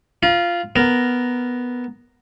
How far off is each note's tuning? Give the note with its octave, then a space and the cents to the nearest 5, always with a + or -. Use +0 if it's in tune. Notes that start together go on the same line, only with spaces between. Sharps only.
F4 -10 A#5 +45
B3 +0 A#4 +0